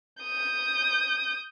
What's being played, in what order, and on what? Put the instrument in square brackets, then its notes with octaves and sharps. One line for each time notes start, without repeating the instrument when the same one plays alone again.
[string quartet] D#6 G6